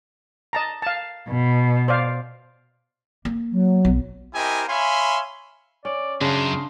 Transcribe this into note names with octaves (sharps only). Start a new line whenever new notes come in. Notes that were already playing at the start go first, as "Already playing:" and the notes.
D#5 A5 A#5
F5 A5
B2
C5 D5 F5
A#3
F#3
B1
C4 E4 G4 A#4 D#5 G#5
C#5 E5 F5 G#5 B5 C6
C#4 D5
F#2 C#3 D4 F5 C6